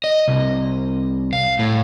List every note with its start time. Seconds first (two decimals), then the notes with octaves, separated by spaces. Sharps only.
0.04 D#5
0.28 C2
1.33 F5
1.59 A2